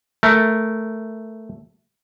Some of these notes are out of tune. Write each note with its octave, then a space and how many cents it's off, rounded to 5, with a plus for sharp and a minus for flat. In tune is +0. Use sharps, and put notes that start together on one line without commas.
A3 +0 A#4 +0